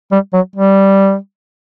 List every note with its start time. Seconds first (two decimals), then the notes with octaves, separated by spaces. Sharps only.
0.12 G3
0.33 F#3
0.56 G3